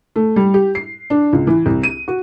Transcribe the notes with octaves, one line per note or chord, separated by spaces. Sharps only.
A3
G3
G4
C7
D4
C#2
E3
C2
D#7
F#4